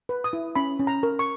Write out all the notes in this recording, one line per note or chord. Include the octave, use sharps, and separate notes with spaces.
B4
D#6
E4
C#4 B5
C#4
A#5
A#4
C#6